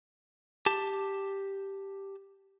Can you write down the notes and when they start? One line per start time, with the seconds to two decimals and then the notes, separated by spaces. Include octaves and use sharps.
0.66 G4 A5